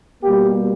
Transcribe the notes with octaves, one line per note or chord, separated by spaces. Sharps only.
B2 G3 A#3 G4